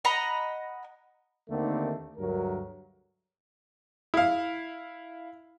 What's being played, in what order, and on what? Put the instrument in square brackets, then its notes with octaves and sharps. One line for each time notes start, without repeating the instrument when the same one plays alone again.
[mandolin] D#5 F#5 A#5 B5
[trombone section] D#2 D3 D#3 A3 A#3 C4
D2 G2 F#3 A3 A#4
[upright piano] E4 F5